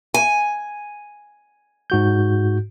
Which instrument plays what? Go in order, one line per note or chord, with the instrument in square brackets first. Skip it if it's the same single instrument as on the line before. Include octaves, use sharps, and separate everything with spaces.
[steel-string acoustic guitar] G#5
[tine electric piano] G#2 F#4 G6